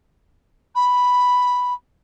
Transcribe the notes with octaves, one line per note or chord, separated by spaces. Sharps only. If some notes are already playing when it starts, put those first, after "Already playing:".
B5